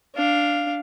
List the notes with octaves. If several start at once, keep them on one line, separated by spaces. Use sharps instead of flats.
D4 F5